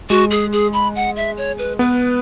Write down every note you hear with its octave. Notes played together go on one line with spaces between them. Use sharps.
G#3 F#4
G#4
G#4
B5
F#5
E5
C#5
B4
B3 B4